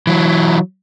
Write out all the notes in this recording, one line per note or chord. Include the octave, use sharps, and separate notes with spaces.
E3 F#3